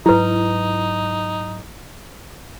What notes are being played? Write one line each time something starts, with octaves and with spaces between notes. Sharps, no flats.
G#2 F#3 D#4 E4 B4